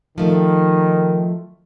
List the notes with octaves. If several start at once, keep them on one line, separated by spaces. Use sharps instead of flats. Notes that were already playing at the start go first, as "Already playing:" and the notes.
D#3 F3 A3